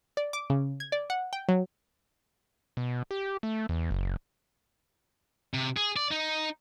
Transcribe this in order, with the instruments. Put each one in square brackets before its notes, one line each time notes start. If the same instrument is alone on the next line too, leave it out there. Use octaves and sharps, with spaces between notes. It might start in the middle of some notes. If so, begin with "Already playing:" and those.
[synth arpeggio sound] D5
D6
C#3
G#6
D5
F#5
G5
F#3
[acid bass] B2
G4
A3
E2
F#1
[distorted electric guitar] C3
G#4
D5
D#4